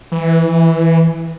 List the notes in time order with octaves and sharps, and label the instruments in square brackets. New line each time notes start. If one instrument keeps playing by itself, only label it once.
[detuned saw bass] E3